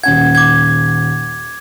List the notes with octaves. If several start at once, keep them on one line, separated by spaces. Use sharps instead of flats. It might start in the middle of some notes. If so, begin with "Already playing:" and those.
D#1 C#4 F#5 G#6
D6 G#6